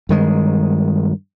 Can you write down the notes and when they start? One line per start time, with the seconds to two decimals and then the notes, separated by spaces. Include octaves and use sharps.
0.09 G2 D#3 G#3